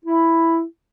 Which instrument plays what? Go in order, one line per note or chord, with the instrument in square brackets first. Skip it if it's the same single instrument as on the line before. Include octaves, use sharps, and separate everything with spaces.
[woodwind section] E4